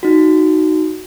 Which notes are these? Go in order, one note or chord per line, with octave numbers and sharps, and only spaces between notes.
D#4 F#4